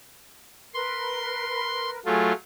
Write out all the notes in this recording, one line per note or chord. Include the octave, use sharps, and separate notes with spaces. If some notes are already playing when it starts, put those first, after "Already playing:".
A#4 B4 C6
F#3 A3 F4 G#4